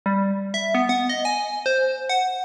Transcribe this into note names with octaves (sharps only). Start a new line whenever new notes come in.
G3
E5
B3
F#5
D#5
G#5
C5
F#5